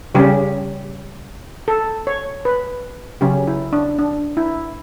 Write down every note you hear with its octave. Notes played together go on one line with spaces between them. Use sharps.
C#3 G3 C#4 G4
A4
C#5
B4
C#3 F#3 C#4 G4
E4
D4
D4
E4